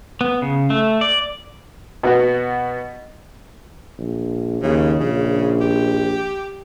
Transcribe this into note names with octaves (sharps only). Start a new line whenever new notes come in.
B3
C#3
A3
D5
B2 B3 F#4
A#1
D#2 C#3
A#1 C#3
G4